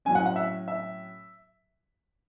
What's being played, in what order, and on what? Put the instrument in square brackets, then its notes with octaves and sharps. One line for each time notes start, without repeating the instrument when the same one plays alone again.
[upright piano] A2 F#3 C#4 G#5
F#5
F#5
E5
E5